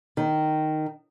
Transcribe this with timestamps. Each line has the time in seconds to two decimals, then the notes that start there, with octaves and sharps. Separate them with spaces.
0.17 D#3